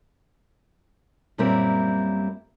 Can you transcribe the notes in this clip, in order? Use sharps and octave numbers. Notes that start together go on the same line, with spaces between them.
F#2 A#2 G3 C4 E4 A#4